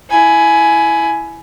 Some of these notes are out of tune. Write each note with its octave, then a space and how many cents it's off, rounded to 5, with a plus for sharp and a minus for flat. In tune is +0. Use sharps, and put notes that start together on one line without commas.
E4 +0 G#5 +15